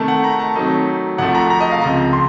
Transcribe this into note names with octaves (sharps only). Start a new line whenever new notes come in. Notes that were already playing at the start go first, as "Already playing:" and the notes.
Already playing: C3 D#3 A3 A5
F#5
A#5
A5
C3 D#3 F#3 A3 D#4
C2 C3 F3 A3 F#5
A#5
A#5
D#5
F5
C#2 C3 F3 A#5
C6